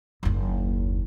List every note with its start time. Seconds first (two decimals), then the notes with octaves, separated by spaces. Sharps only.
0.23 F#1 D#2